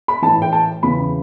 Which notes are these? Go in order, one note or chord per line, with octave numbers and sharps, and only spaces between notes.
B5
A2 E3 A5
G5
A5
E2 C#3 E3 B5